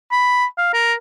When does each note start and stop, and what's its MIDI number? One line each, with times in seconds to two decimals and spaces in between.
0.12 0.45 83
0.58 0.72 77
0.73 0.94 70